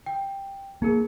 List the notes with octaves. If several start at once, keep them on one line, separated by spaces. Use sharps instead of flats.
G5
A#3 D#4 G#4 A#4